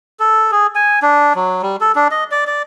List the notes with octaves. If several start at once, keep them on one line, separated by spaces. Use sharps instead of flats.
A4
G#4
G#5
D4
F#3
G3
A4
D4
D#5
D5
D5